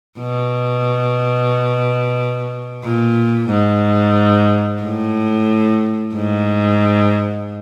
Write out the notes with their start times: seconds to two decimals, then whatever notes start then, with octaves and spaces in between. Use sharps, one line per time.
0.19 B2
2.83 A#2
3.50 G#2
4.82 A2
6.14 G#2